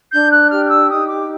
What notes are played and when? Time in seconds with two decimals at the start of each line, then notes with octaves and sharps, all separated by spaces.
0.12 D4 G6
0.31 F#6
0.50 G4 F6
0.64 F6
0.70 E6
0.89 D#4 D#6
1.08 D6